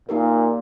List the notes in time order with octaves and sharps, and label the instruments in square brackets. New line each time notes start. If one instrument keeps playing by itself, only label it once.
[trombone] A#2 [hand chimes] A#3 D#4 G4 A#4